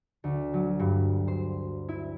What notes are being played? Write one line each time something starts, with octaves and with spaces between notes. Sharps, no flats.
D2
F#3
G2
C5
E4